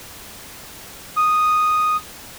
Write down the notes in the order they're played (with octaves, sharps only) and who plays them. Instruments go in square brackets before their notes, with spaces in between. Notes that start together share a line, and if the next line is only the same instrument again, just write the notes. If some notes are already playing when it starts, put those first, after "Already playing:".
[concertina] D#6